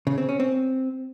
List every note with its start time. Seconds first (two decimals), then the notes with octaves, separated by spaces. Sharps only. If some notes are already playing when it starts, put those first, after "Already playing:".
0.07 C#3
0.18 C4
0.29 C#4
0.40 C4